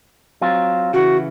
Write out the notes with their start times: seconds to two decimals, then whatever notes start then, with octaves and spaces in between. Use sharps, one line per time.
0.41 F#3 C4 F4
0.93 C#3 E3 F#4